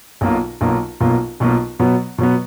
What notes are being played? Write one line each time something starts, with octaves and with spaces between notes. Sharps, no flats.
B1 B2 A#3 F4
B1 B2 A#3 F4
B1 B2 A#3 F4
B1 B2 A#3 F4
B2 F#3 B3
B2 F#3 B3